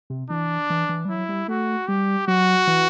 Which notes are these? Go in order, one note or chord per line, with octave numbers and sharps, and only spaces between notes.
C3
E3 D4
E3
E3
G3
F#3 E4
G3
A3 F#4
G3 G4
F#3 F#4
E3